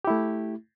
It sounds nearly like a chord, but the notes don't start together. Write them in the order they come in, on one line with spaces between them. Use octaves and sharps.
G4 E4 A3